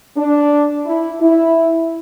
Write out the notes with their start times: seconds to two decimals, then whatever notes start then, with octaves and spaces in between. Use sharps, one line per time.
0.17 D4
0.86 E4
1.21 E4